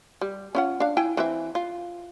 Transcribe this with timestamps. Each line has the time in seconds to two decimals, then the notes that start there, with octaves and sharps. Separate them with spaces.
0.21 G3
0.55 C#4 F4 F#5
0.80 D4 F5
0.97 E4 G5 G#5
1.17 E3 C4 E5
1.55 F4